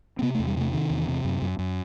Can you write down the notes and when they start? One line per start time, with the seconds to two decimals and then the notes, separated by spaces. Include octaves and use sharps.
0.19 C4
0.22 C3 B3
0.35 A3
0.39 E2
0.47 G3
0.57 C3 A3
0.73 C3 D#3
0.90 E2
1.08 C3
1.25 F#2
1.42 F#2
1.59 F#2